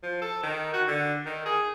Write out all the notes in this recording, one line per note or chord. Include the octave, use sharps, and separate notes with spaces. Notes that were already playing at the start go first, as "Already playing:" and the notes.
F3
A4
D#3
F#4
D3
D#3
G#4